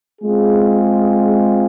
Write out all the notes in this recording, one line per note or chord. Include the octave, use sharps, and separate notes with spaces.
G#3 C4 F4 G#4